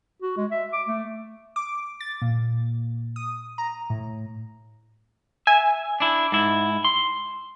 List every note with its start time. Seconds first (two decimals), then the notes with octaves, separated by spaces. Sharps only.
0.22 F#4
0.37 G#3
0.51 E5
0.73 D6
0.87 A3
1.56 D6
2.00 A6
2.22 A#2
3.16 D#6
3.58 A#5
3.90 A2
5.47 E5 G#5
6.00 D4 E4
6.32 G#2 E4
6.85 C6